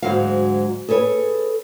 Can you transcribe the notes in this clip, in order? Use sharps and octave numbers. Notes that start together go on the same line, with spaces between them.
D2 G#2 F#3 G#3 F#4 F5
G#4 A4 B4 C#5